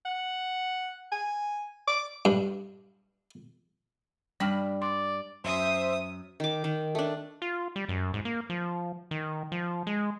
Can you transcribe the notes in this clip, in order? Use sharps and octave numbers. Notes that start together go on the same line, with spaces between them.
F#5
G#5
D6
G2
G2 G3 D4 G5 B5 F6
D5 C6
F#2 C5 E5 D#6
D#3 D6
D#3
A3 D4
F4
G3
F#2
G#2
A#3
F3
D#3
F3
G#3